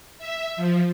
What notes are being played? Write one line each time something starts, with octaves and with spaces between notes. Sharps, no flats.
E5
F3